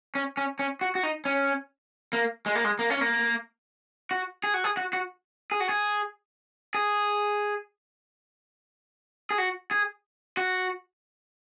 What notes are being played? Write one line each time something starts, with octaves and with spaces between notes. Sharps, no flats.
C#4
C#4
C#4
F#4
F#4
D#4
C#4
A#3
G#3
A#3
G#3
A#3
C#4
A#3
F#4
G#4
F#4
G#4
F#4
F#4
G#4
F#4
G#4
G#4
G#4
F#4
G#4
F#4